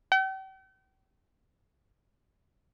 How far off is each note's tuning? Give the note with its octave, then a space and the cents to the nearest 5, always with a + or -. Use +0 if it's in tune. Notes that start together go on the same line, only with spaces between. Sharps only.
G5 -40